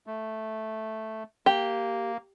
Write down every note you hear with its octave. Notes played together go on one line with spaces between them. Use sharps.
A3
A#3 G4